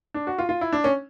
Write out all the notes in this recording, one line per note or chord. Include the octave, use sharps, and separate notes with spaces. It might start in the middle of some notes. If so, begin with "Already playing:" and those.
D4
F#4
F4
F4
E4
D4
C#4